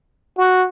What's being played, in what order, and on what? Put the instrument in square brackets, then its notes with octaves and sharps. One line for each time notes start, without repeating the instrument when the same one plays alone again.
[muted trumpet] F#4